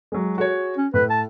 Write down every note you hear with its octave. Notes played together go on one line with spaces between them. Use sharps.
F#3 G#3
F#4 G#4 C#5
C#4
A2 B4
A5